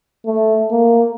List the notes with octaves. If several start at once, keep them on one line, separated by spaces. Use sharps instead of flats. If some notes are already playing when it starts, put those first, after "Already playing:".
A3
A#3